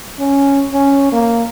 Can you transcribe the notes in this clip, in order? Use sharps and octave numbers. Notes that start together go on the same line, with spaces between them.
C#4
C#4
A#3